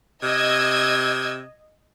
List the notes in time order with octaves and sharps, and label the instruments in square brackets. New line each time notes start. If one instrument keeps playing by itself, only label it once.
[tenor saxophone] C3 [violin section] D#5 E6 G#6